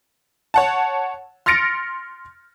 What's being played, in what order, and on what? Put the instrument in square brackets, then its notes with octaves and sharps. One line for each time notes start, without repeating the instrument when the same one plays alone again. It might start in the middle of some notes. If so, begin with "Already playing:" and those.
[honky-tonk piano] C#5 F#5 A5
C6 F6 A6 A#6 C#7 D7